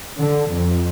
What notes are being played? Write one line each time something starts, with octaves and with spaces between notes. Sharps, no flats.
D3
F2